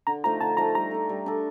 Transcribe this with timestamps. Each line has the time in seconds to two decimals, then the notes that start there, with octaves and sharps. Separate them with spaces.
0.07 D3 A#5
0.24 F3 A3 D#4 A#5
0.41 D3 A5
0.57 F3 A3 D#4 A#5
0.75 G3 A#5
0.91 D4 A4
1.09 G3
1.26 D4 A4